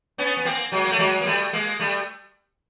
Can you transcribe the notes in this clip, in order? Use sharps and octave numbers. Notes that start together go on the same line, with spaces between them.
B3 C#4
B3
A#3 C4
F#3 G#3
A#3
A3
F#3 G#3
A#3
G3 A3
G#3 A#3
G3 A3